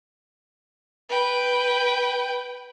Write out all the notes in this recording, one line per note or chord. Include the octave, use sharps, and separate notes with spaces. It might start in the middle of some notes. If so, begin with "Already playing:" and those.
B4 G5